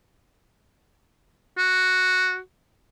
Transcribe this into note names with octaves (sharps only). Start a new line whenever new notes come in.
F#4